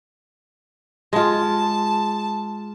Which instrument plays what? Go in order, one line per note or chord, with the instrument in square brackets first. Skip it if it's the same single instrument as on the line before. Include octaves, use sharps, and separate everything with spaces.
[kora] G#3 F4 [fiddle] A5